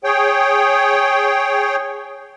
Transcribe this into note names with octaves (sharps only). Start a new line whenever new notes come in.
G#4 C#5 G5